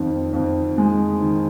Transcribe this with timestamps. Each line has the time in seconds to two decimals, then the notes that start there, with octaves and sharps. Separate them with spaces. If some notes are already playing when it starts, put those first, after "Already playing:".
Already playing: F2 D#3
0.33 F2
0.78 G#3
1.21 D#3